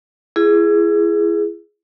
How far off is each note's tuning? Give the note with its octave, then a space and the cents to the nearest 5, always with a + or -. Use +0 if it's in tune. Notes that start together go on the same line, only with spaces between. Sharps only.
E4 +35 G#4 +0